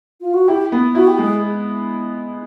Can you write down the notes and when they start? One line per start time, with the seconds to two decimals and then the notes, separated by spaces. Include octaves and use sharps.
0.21 F4
0.34 F#4
0.48 E4 G4
0.72 B3
0.95 E4 F#4
1.07 G4
1.18 G#3 G#4